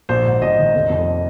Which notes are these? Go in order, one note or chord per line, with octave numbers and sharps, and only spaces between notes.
A#1 C5
G#2
A#1 D#5
D#3
F1
F2